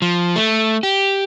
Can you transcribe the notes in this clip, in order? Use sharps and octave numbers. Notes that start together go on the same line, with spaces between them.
F3
A3
G4